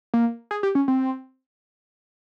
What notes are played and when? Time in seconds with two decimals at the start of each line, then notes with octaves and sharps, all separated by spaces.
0.14 A#3
0.51 G#4
0.63 G4
0.75 C#4
0.88 C4